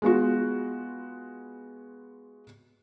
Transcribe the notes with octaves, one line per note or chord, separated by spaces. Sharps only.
G#3 B3 F4 F#4